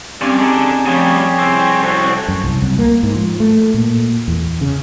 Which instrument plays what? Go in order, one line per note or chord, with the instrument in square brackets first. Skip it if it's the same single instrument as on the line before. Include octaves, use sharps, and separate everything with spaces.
[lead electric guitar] G2 [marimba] C4 C#4 G4 [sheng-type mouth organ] D5 F5 G#5
[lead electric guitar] D3 D4 [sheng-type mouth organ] D#4 G#4
[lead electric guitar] C#3 G3 [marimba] F3 C4 [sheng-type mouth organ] G4 G#4 C#5
[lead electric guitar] C2 C4 [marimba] E6
[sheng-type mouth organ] F#4 A4 C#5
[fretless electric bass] F#2
C2
C2
A#3
G#2
F3
A3
A#2
E2
C#3